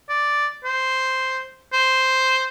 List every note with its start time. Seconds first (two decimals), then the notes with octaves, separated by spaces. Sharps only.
0.10 D5
0.64 C5
1.73 C5